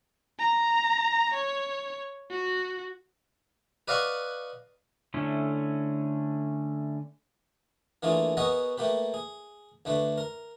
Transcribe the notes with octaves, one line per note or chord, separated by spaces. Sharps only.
A#5
C#5
F#4
B4 D5 D#5 F5 F#5 C#6
D3 A3 C#4 E4
E3 A3 A#3 D4 F4 G#4
B3 G#4 A#4 C#5 D#5 F#5
A3 A#3 G4 B4
G#4
D2 A3 D4 B4
A#4